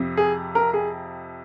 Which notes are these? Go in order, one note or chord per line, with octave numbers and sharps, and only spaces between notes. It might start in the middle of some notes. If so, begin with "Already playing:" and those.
Already playing: F2 C3 F3
G#4
A#4
G#4